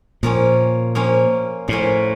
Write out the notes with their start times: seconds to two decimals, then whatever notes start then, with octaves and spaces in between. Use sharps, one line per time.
0.23 A#2 F3 A#3 C#4
0.95 F3 A#3 C#4
1.68 A2 F3 A#3 C#4